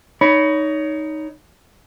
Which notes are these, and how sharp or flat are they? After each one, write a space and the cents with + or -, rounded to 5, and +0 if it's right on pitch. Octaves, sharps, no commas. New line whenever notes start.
D#4 +0 C#5 +25 B5 +0